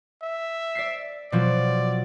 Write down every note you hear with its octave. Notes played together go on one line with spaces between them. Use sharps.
E5
D5 B6 C7
B2 F3 F#3 D5